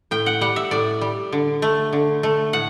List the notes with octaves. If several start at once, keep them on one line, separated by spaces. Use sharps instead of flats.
A2 G5
F#5
G3 F#5
E5
A2 D5
G3
D3
A3
D3
A3
A2 F#5